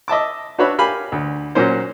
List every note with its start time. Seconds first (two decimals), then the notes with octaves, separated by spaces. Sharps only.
0.08 D#5 E5 A5 D6
0.58 D4 F#4 B4 C#5 E5 B5
0.78 G4 A#4 F5 G#5 B5
1.12 D2
1.55 A#2 F#3 C#4 A#4 C5